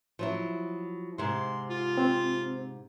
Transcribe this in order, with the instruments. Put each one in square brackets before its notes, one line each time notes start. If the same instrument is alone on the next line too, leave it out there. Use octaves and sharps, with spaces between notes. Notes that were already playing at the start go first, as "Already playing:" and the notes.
[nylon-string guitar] F3 F#3 E4
[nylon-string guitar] G#2 C3 [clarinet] C6
[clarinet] F4
[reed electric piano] C4 C5